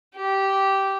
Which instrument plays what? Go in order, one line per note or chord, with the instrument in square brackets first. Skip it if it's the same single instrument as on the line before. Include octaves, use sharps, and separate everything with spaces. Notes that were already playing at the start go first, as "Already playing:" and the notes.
[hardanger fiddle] G4